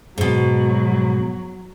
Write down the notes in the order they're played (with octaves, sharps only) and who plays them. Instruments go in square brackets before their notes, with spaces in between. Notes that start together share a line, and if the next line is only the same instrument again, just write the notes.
[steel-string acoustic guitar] G#2 B2 [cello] F#3